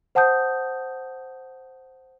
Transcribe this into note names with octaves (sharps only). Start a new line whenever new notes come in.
C5 F#5 A5 D#6 G6